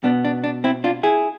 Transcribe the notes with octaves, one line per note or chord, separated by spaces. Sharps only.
B2 B3 D4
D4
D4
C4 E4
D4 F4
E4 G#4